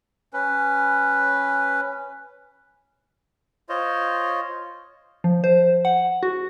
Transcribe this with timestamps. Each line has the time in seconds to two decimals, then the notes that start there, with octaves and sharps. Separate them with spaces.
0.33 C#4 B4
3.69 F4 C5 C#5 D#5
5.24 F3
5.44 C5
5.85 F#5
6.23 F#4